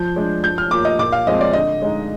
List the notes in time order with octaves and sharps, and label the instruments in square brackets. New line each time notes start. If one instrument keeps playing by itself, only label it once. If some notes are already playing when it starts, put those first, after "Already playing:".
Already playing: [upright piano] F3 G6
G#3 D4
F3 G6
F6
A#3 F4 D6
D#5
A#2 D6
F5
F3 G#3 C4 D#5
D5
D3 D#5
G#3 D#4